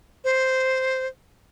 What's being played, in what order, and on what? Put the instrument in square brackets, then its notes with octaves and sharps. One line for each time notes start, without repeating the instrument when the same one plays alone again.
[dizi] C5